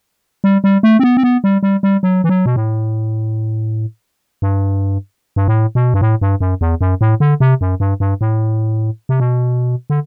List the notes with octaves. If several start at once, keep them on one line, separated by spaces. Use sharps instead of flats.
G3
G3
A3
C4
B3
C4
B3
G3
G3
G3
F#3
E3
F#3
B2
A2
G2
G2
A2
B2
G2
A2
G2
F#2
E2
F#2
A2
D3
C3
F#2
G2
G2
A2
C3
B2
D3